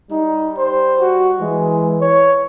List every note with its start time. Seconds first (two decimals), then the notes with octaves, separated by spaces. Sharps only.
0.11 G3 D#4
0.58 C5
1.01 F#4
1.41 E3 G#3
2.01 C#5